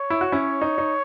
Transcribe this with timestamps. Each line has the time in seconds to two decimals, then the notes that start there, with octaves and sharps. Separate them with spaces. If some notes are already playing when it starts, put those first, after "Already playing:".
Already playing: C#5
0.10 E4
0.21 F#4
0.32 C#4 E4
0.61 D#4
0.78 D#4